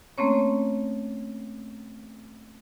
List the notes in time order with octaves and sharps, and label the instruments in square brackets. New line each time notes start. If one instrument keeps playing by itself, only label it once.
[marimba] A3 A#3 C4 C#4 C#5